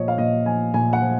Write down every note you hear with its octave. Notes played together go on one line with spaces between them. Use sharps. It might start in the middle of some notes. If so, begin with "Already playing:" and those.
Already playing: A#2 F3 C#5 D#5
F5
A#2 D#5
F3 G#5
A#2 G#5
F#5
F3